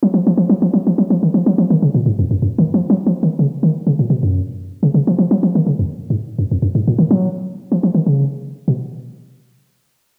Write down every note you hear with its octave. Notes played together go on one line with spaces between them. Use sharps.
F#3
F3
F3
F3
F#3
F3
F#3
F3
F#3
F3
D#3
F3
F#3
F3
D#3
C#3
A#2
G#2
F2
F#2
F#2
D#3
F3
F#3
F3
D#3
C#3
D#3
C#3
A#2
B2
F#2
C#3
C#3
F3
F3
F#3
F3
D#3
C#3
F2
G#2
F#2
F2
F#2
G#2
A#2
D#3
F#3
F3
F3
D#3
C#3
B2